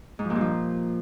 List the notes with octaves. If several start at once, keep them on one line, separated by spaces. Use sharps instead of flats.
G#2
F3
A#2
G2
F3